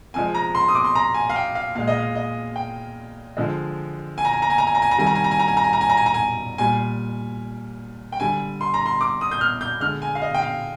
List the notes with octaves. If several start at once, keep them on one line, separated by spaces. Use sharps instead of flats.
C3 F3 G#3 G#5
A#5
C6
D#6
D6
C6
A#5
G#5
F5
G5
F5
A#2 G#3 F5
D#5
F5
D#5
G5
D3 F3 G#3
G#5
A#5
G#5
A#5
G#5
A#5
G#5
A#5
G#5
A#5
C3 D#3 G3 G#5
A#5
G#5
A#5
G#5
A#5
G#5
A#5
G#5
A#5
G#5
A#5
G#5
A#5
G#5
A#2 G3 G#5
G5
D3 G3 G#5
C6
A#5
C6
D6
D#6
G6
F6
G6
D3 G#3 F6
G#5
F5
D#5
G5
F5